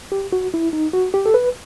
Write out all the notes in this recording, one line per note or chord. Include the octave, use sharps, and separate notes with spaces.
G4
F#4
E4
D#4
F#4
G4
A4
B4